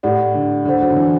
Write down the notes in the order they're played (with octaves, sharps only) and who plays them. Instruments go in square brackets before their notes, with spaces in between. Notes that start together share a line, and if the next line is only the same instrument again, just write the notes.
[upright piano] A2 [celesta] G4 D5 F#5
[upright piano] D3
[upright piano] D3 [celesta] D4 A4 C5 F#5
[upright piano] F#3
D3
E3